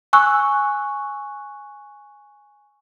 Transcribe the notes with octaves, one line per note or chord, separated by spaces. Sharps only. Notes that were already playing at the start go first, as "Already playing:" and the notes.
G#5 C#6 E6 F#6